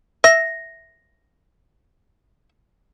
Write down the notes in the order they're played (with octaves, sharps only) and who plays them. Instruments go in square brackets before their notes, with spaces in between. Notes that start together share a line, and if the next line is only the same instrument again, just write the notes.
[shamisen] E5 [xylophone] A#6